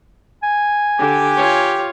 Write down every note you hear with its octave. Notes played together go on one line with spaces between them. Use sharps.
G#5
D3 G4
F4 C#5